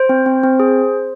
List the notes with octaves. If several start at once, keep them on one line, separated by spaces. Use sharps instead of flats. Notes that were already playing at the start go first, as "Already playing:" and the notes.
Already playing: C5
C4
C4
C4
G#4